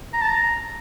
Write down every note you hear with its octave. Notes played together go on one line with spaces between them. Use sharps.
A#5
A5
A#5